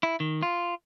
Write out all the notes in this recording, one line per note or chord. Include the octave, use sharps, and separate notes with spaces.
E4
D#3
F4